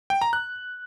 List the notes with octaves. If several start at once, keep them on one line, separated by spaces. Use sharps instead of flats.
G5
A#5
F#6